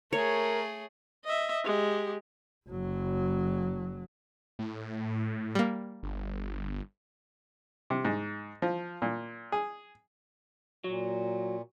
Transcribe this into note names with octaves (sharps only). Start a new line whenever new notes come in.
A3 G#4 A#4 C#5
D#5 E5
G#3 G4
F#1 F#3
A2
G3 A#3
G1
C3
G#2
F3
A#2
G#4
A#2 F#3